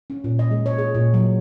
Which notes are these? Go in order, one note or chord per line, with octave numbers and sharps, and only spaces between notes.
C#4
A#2
D#5
G#3
C#5
G#4
A#2
F#3